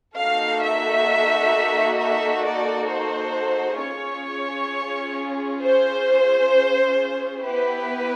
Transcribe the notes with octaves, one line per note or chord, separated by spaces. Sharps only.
A#3 D#4 F#4 A4 F5
E5
E5
D5
C5
C#4 F4 G#4 C#5
C5
B3 E4 G4 B4